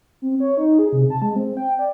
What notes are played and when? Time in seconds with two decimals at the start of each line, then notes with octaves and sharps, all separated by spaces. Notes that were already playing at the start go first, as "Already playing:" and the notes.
0.22 C4
0.40 C#5
0.57 D#4
0.79 G#4
0.93 C3
1.10 A5
1.22 G#3
1.36 C4
1.57 G5
1.79 D5